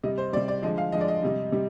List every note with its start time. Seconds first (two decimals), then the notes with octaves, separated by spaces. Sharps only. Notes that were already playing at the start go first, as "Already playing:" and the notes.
0.03 C3 G3 D#5
0.18 C5
0.33 G3 D5
0.37 C3
0.48 D5
0.63 D3 F3 G#3 D#5
0.78 F5
0.92 D3 F3 G#3 D#5
1.01 D5
1.08 D#5
1.23 C3 G3
1.52 C3 G3